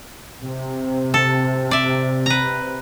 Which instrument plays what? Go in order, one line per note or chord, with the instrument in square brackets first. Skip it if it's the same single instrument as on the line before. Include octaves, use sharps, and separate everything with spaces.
[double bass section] C3
[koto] A4
D5 E5
B4 A#5